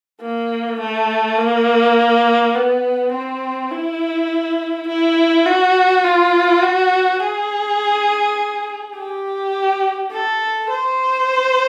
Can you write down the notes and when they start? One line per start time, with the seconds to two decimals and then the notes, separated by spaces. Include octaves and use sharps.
0.21 A#3
0.81 A3
1.38 A#3
2.55 B3
3.12 C4
3.71 E4
4.88 E4
5.46 F#4
6.04 F4
6.62 F#4
7.20 G#4
8.96 G4
10.12 A4
10.70 C5